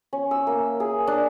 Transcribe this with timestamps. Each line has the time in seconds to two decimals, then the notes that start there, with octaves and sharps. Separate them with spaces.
0.13 C#4
0.31 E6
0.47 A#3
0.80 G#4
1.07 D4